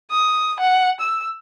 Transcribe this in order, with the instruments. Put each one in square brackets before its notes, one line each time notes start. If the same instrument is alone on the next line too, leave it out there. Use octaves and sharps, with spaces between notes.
[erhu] D#6
F#5
E6